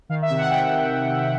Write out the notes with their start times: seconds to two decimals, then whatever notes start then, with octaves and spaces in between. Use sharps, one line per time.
0.09 D#3 F5
0.22 E5
0.30 C3
0.37 F#5
0.50 C3 G5
0.71 D#3